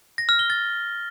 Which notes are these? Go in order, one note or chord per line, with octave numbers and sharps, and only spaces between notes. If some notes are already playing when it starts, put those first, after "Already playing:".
A#6
F6
G7
A6